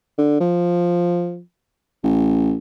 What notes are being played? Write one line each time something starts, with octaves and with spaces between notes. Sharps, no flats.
D3
F3
A1